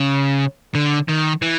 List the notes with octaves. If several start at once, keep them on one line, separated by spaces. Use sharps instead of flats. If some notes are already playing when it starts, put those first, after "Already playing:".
Already playing: C#3
D3
D#3
E3